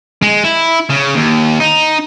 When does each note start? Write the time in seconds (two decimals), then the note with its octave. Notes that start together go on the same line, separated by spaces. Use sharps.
0.22 G#3
0.44 E4
0.89 C#3
1.15 D#2
1.60 D#4